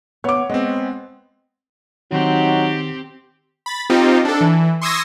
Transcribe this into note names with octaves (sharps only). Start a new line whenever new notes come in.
B3 C#5 D6
G#3 B3 C4 D#5
D#3 F#3 C4 D#4 G4
B5 A6
C4 D#4 F4 G4
D4 A4
E3
C6 C#6 D#6 E6 G#6 A#6